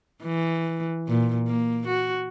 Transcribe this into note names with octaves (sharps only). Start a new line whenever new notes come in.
E3
A#2
A#3
F#4